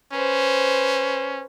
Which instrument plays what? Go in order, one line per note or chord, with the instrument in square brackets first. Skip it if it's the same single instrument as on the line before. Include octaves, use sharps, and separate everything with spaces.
[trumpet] C#4 [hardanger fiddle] B4 C5